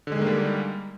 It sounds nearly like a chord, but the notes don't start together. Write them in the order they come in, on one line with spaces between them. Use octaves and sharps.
D3 G#3 D#3 A#3 G3